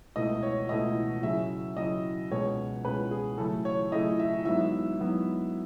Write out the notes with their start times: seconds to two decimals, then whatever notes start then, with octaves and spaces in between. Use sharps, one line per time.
0.16 C#2 B2 A3 E4 D#5
0.43 C#5
0.69 C#2 B2 A3 E4 D#5
1.23 C#3 F#3 C#4 E4 E5
1.77 C#3 F#3 C#4 E4 D#5
2.31 C#2 B2 G#3 C#4 C#5
2.84 C#2 B2 G#3 C#4 B4
3.11 G#4
3.38 C#3 F#3 A3 E4 A4
3.65 C#5
3.92 C#3 F#3 A3 E4 D#5
4.19 E5
4.45 G#2 F#3 B3 E4 E5
4.99 G#2 F#3 B3 E4